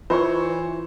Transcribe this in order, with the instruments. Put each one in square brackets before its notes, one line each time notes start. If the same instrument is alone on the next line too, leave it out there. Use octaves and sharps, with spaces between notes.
[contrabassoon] E3 [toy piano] F4 [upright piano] C5 C#5 C#6